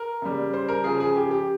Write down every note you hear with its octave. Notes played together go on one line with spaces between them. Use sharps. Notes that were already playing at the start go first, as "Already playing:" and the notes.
Already playing: A#4
C#3 G3
C5
A#4
C#3 F3 G#4
G#4
G4
G4